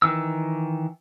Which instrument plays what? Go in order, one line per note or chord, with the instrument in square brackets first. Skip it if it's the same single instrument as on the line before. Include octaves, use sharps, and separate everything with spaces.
[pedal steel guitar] D#3 E3 E6